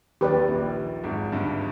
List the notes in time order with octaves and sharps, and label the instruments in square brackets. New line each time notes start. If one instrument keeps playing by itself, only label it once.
[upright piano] D#2 D#3 [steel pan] G4 B4 D5
[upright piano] A#1 A#2
G#1 G#2
G1 G2